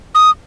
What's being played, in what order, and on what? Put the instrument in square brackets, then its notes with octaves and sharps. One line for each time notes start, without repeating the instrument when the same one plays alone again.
[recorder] D#6